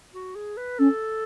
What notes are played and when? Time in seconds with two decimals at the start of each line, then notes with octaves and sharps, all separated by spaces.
0.14 F#4
0.35 G#4
0.57 B4
0.79 C#4 A4